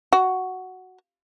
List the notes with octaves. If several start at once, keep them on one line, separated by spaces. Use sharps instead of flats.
F#4